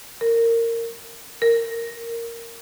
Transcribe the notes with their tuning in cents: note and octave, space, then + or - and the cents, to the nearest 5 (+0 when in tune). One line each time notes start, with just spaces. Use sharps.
A#4 -20
A#4 -5